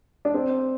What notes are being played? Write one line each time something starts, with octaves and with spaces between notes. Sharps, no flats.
D4
C4